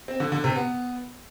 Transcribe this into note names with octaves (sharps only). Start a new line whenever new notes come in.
C4
D3
D3
C3
B3